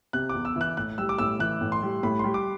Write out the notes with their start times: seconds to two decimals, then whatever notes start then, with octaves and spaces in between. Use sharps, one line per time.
0.13 C3 F#6
0.29 E2 D6
0.45 E6
0.56 E3 F#6
0.77 A2 F#6
0.98 G3 E6
1.09 D6
1.18 A2 E6
1.39 E3 F#6
1.61 A2
1.72 C6
1.83 G3
2.03 A2 B5
2.19 G3 C6
2.34 D6